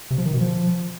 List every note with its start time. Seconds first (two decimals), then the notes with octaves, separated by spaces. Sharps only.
0.10 C3
0.18 F3
0.26 D#3
0.33 B2
0.41 F3